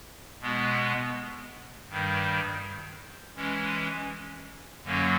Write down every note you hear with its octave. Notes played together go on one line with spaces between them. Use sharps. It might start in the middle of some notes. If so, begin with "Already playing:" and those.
B2 G#3 B3
G2 D#3 G3
E3 G#3 C#4
F#2 D3 F#3 A#3 C#4